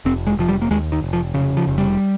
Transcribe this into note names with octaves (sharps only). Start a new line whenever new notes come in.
F1 C4
G#3
F1 F3
G3
A#3
D#2 G#3
D#3
F1
F3
C#3
F3
F1
G3